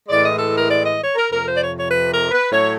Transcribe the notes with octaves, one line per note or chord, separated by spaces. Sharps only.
A2 E3 G#3 D5
D#5
A4
A#4
D5
D#5
C#5
A#4
F2 C3 F3 A#4
C5
D5
C#5
C#5
B4
A#4
B4
A2 F#3 A3 C#5